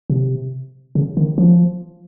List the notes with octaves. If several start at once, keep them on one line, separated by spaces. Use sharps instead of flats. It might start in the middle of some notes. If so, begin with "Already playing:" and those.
C3
C#3
D#3
F3